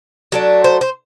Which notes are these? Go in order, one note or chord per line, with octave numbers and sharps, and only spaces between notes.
F#3 A3 D4
C5
C5